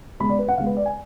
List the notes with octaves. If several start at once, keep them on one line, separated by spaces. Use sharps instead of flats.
C#3 G#3 B3 B5
D5
B4
F#5
C#3 G#3 B3 F5
B4
D5
G#5